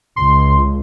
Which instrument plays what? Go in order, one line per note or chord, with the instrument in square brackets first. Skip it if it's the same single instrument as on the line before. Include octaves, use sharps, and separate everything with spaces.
[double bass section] C#2 [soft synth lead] C6